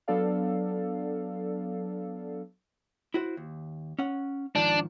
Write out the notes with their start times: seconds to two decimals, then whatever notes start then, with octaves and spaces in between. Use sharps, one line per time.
0.08 F#3 B3 D4 A4 D5 F5
3.14 E4 F#4 C5
3.37 D#2
3.99 C#4 F#5
4.56 G#2 D#3 F3 D4